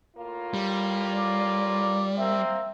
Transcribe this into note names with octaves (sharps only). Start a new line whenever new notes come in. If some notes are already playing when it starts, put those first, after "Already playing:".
A2 A#3 F4
G3
D5
A#3 C4 E5